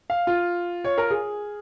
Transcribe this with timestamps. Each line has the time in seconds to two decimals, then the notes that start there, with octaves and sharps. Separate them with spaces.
0.10 F5
0.27 F4
0.84 C#5
0.98 A#4
1.10 G#4